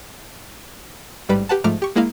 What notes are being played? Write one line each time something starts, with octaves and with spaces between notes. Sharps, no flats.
A1 G#2 G3 B4 D7
G4 B4 F#5 A5
G#2 F3 A3 A#5 D6 F6
G4 C#6
G#3 A#3 E4 D#5 F5